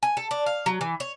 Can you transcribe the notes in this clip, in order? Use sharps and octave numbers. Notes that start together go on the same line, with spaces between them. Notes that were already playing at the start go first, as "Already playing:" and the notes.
G#5
A4
D4
F5
F#3
E3
C#5